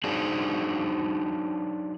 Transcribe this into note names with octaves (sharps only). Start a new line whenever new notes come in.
F#3 D4 D#4 G#4 C5